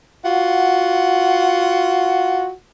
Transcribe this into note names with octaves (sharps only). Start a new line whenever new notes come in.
F4 F#4 F#5